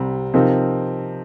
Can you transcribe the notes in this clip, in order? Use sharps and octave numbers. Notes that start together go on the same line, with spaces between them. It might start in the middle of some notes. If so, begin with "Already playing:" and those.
Already playing: C2 C3 G3
C3 F3 C4 D#4 A#4